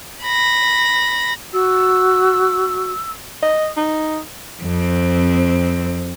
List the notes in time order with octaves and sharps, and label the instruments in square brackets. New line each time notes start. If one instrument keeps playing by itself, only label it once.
[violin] B5 A#6
[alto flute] F#4 [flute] E6
[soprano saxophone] D#5
D#4
[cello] F2 C4